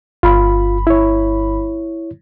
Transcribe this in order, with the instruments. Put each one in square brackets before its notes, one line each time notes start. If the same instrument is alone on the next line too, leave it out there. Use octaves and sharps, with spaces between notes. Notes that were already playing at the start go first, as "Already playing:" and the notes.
[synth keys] G1 B5 [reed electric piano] F4
[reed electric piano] E4 C#5